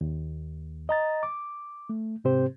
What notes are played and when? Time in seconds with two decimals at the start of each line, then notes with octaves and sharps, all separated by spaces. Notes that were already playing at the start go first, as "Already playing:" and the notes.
0.01 D#2
0.89 D#5 A#5 A6
1.23 D6
1.89 A3
2.24 G#2 C3 C4 G4 C5